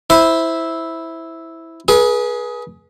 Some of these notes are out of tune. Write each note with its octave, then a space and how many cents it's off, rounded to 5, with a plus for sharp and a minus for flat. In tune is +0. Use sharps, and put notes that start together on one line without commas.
E4 -5 C5 +0 B5 +0
G#4 +15 B4 -30